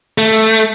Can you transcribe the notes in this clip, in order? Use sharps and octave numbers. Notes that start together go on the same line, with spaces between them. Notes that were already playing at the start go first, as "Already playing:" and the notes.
A3